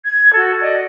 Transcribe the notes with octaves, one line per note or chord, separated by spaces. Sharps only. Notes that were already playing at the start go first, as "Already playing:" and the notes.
G#6
F#4 A4
D5 D#5